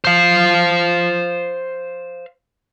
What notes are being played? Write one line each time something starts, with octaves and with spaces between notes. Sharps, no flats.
C5 F5